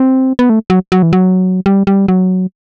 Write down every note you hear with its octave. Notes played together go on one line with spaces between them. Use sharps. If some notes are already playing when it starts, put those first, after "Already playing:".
Already playing: C4
B3
A3
F#3
F#3
E3
F#3
G3
G3
F#3